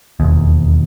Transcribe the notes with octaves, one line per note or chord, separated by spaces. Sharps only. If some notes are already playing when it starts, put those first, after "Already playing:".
E1 D#2